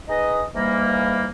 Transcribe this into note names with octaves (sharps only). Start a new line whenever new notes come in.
D#4 G#4 B4 D#5
G#2 E3 G3 A#3